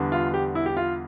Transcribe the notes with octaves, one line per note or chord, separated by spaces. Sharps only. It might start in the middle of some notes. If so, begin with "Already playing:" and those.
Already playing: E2 D3 G3
F4
G4
E4
G4
F4